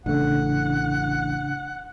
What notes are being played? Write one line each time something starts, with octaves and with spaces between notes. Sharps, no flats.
A1 C#3 A3 D4 F#5